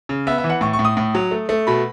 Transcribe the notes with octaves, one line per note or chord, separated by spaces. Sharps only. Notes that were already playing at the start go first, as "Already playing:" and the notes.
C#3
B3 E5
E5
E3
F#5
A2 C#6
C#6
A2
D#6
A2
F#3
A3
A3
B2 B5